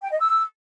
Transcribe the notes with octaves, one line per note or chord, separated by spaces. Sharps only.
G5
D#5
E6